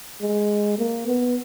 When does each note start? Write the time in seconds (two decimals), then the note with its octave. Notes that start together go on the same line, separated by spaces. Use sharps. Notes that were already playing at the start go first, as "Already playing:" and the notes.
0.22 G#3
0.78 A#3
1.07 B3